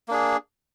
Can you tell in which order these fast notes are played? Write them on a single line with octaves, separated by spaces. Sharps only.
A#3 D4 G#4